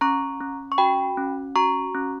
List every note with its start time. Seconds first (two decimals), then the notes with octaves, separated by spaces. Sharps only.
0.01 C#4 A#5 C#6
0.41 C#4
0.72 C#6
0.78 F#4 G5 B5
1.17 C#4
1.56 F#4 A#5 C#6
1.95 C#4